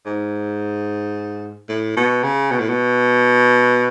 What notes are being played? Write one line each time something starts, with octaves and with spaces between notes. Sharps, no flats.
G#2
A2
B2
C#3
B2
A2
B2